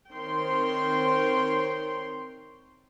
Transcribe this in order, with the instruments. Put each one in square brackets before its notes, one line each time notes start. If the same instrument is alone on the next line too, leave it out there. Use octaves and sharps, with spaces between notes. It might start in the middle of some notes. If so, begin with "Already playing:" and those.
[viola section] D#3 C4 C5 C#5 G5 C6